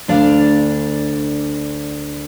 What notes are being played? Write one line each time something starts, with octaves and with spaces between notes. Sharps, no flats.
D2 D4 D5 F5